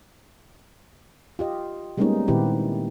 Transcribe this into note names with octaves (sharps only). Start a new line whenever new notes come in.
F4 G4 D#5
G3 G#3 A#3 B3 C#4 D#4
A#2 D#3 C4 E4 G4 B4